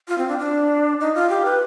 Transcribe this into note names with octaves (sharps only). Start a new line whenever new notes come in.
F4
C4
D4
D4
D#4
F4
G4
B4